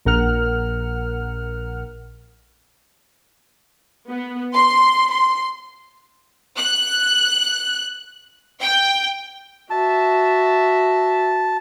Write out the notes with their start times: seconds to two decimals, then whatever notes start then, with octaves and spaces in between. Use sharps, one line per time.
0.05 A#1 A#4 F#5 F6
4.10 B3
4.55 C6
5.10 C6
6.57 F#6
8.61 G5
9.70 F#4 E5 A5